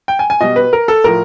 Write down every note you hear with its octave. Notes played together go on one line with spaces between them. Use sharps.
G5
G#5
G#5
B2 G3 D#5
B4
A#4
A4
A2 F3 A#4